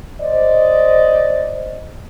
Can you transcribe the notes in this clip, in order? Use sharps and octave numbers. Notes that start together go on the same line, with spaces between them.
C5 D5 D#5